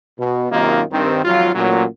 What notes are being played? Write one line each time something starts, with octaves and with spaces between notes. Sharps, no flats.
B2
F#2 C3 D#3 A#3 D#4 F4
G2 D#3 C4
G#1 F3 F#3 F4
A1 A#2 F#3